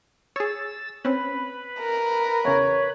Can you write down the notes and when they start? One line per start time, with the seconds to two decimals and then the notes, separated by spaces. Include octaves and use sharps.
0.36 G#4 C#5 E6 A6
1.05 C4 C#4 B4 B5
1.80 A#4
2.45 E2 C#3 C#5